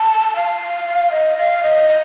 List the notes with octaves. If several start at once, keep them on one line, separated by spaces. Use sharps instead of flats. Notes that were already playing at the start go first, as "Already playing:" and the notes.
Already playing: A5
F5
D#5
F5
D#5
D#5